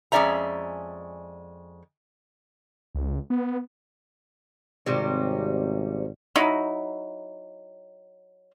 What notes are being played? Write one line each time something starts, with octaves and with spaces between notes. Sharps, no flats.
F2 G#3 C#4 D5 E5 A#5
C#2
B3
G#1 C3 G3 C#4
F#3 D#4 E4